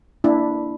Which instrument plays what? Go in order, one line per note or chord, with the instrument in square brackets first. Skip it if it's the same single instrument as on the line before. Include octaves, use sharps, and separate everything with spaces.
[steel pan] A#3 D4 E4